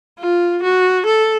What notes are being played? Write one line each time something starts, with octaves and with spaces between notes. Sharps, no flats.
F4
F#4
A4